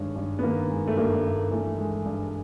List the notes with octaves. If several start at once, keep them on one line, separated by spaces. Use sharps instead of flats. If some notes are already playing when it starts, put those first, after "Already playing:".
Already playing: G2 D#3 G#3 C#4
G2
B3
D#3 A#3
G#3
A3
G2 A#3
G2
E3 A3
G#3
G2